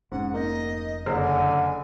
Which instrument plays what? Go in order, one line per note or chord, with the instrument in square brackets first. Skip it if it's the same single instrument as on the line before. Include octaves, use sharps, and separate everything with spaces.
[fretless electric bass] F1 C#4 [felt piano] G#2 [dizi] F#5
[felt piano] A#3 D#4 [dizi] D#5
[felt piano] F#1 C5 F6 [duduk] D3
[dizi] G#5